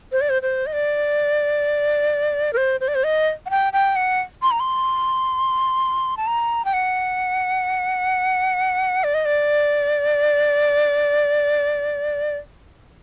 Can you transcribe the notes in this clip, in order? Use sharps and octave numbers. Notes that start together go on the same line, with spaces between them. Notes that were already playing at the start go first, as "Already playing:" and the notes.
C5
D5
C5
C5
D#5
D5
A#4
C5
C5
D5
C5
D#5
F#5
G5
G5
F#5
C6
A#5
C6
A5
A#5
G5
F#5
D5
D#5
D5